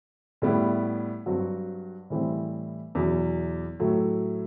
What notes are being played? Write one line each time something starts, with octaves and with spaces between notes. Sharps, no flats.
A2 G3 B3 E4
G2 F#3 C4 F#4
A2 E3 G3 C4
E2 B2 F#3
A2 F#3 A3